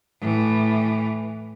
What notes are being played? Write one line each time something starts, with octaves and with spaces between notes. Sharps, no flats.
A2 E3